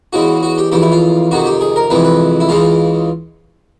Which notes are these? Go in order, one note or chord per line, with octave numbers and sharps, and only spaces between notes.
E2 C#3 E3 G#3 F#4
F#4
G4
F2 C#3 E3 G4
E4
F4
F2 C3 D#3 F#4
G4
G#4
A#4
F2 C3 E3 G#3 B4
B4
E4
C#2 C#3 E3 G#3 F4